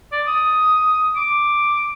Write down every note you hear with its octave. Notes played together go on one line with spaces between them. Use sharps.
D5
D#6
D6